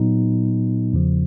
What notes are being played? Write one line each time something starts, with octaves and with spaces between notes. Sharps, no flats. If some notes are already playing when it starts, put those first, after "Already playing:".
Already playing: A#2 F#3 B3 D#4
E2 C#3 F3